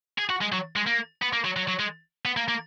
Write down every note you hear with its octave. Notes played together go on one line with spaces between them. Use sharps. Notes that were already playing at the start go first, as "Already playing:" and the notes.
G#4
F#4
G#3
F#3
G#3
A#3
B3
A#3
F#3
F#3
F#3
G#3
B3
A#3
A#3